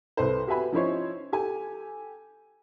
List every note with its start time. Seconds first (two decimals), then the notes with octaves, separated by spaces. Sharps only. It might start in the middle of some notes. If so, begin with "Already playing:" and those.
0.17 C2 A4 B4 C5
0.47 F#4 G4 B4 E5 G#5 B5
0.72 F3 C#4 D#4 E4 C5 C#5
1.33 G4 A4 G#5